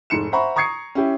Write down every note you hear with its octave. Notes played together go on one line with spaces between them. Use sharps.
F1 G#2 C#7 E7
C5 E5 F#5 A#5 B5 C#6
A#5 C#6 D#6 G#6 C7 C#7
C#4 E4 G4